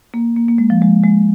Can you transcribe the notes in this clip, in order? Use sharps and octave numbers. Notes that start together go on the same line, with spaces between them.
A#3
A#3
A#3
G#3
F3
G#3
G#3